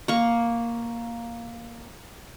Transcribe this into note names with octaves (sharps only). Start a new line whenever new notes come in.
A#3 C#6